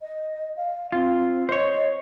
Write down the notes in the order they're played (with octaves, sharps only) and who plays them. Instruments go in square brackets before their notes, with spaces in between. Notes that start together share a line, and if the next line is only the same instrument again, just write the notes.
[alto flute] D#5
F5
[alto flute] C4 [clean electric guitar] F4
[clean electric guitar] C5 C#5 [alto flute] D#5